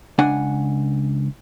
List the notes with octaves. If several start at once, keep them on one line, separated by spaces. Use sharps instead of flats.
C#2 D4 F#5 G#5